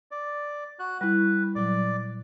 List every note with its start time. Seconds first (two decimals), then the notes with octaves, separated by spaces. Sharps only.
0.11 D5
0.79 F#4 F#6
1.01 G3 E4 B4
1.55 A#2 F#3 D5